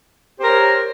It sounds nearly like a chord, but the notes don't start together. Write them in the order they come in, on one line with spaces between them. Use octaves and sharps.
C5 G4 A#4 C#5